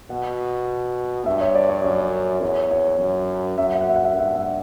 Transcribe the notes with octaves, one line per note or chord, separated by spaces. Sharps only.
B2 F#5
G2 E5
C#5
D5
C#5
F#2 C#5
E2 C#5
C#5
F#2
F#2 E5
F#5
E5
F#5
E5
F#5
E5
F#5
G2 E5
F#5
E5
F#5